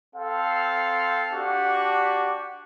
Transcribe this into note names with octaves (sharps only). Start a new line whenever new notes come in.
C4 A4 F5
D4 F#4 G4